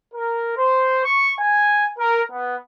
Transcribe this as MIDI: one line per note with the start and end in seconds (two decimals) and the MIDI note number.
0.13 0.57 70
0.57 1.01 72
1.05 1.34 85
1.38 1.85 80
1.98 2.21 70
2.31 2.55 59